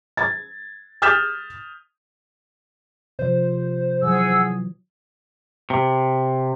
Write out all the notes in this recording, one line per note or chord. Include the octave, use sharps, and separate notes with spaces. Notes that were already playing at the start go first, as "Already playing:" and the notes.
G#6 A6
D#6 F6 G6 A6 B6 E7
C3 F3 C5
E3 F#3 G#4 F#5 E6
C3